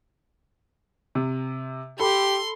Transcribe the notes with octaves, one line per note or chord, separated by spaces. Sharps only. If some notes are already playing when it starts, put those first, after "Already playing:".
C3
G4 A4 B5 C6